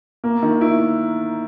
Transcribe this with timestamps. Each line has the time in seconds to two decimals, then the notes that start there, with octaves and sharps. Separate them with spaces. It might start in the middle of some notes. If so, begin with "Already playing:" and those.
0.24 A#3
0.43 D#3
0.61 E4